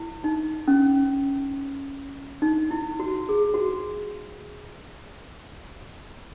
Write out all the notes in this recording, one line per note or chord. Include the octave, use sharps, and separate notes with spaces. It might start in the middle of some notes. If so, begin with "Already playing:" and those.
Already playing: E4
D#4
C#4
D#4
E4
F#4
G#4
F#4